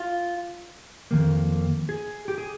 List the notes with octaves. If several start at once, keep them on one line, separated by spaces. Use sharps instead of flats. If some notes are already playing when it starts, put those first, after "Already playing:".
Already playing: F4
F2 D#3 A#3
G#4
G4
G#4